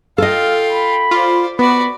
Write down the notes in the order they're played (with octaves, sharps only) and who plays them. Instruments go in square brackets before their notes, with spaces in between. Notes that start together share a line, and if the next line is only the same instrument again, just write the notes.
[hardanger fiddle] F4 G5 [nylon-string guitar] A4 D#5 [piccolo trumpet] F5
[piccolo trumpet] B5
[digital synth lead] F4 [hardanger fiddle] C5 D5
[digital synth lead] B3 [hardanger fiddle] F#4 D5 [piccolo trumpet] B5